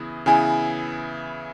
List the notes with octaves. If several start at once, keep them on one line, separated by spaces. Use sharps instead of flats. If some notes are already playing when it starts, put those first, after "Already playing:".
Already playing: C#3 E3 B3 E4 G#4
C#3 E3 B3 E4 G#4 G#5